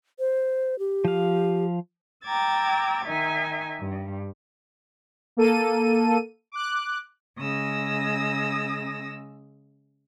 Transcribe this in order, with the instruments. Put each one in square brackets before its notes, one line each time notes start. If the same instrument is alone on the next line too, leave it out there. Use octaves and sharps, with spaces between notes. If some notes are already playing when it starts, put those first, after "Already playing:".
[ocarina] C5
G4
[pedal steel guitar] F3 F5
[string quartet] G5 A#5 D6 E6 G#6 A6
D#3 D#4 E5 G#5
G2
[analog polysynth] A#3 A4 D#7
D6 F#6
[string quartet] C#3 G#3 D#6 E6 A#6